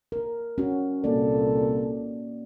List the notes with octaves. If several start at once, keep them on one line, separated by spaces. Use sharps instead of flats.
A#4
C#4 F#4
C2 A#2 A#3 F#4 A4 D5